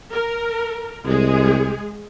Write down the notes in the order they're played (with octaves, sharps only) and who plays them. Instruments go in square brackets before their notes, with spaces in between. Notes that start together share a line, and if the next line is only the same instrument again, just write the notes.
[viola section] A#4
[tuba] C2 [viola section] G#3 G#4